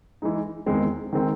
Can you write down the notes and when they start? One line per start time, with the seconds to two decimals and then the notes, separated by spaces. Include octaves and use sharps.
0.22 E3 G#3 D#4
0.66 E2 D#3 G#3 C4
1.13 D#3 G#3 C4